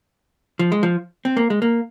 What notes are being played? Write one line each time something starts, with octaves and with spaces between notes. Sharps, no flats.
F3
G#3
F3
C4
A#3
G#3
A#3